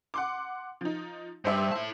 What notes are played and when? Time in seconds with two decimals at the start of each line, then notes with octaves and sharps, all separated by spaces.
0.14 F#5 C6 D6
0.81 F3 D#4
1.45 G2 C5 E5
1.72 E4 A5